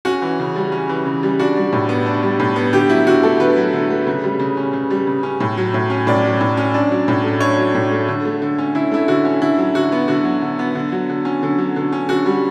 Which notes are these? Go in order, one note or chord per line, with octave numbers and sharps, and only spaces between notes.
C#4 F#4
E3
C#3
G3
C#4
E3
C#3
G3
D4 F#4
G3
A2
B3
D4
G3
A2
B3
D3 G4
F#3 E4
D3 F#4
A3 A4
D3 B4
F#3
D3
A3
C#3
G3
C#3
C#4
C#3
G3
C#3
C#4
A2
F#3
A2
C#4
A2 D5
F#3
A2
C#4
D4
F#3
A2
A3
D4 C#5
F#3
A2
A3
D3
A3
D3
C#4
D3 E4
A3 E4
D3 F#4
C#4
D3 E4
F#3
D3 F#4
B3
D3 F#4
F#3
D3
B3
D3
F#3
D3
C#4
D3
F#3
D3
C#4
D3 F#4
G3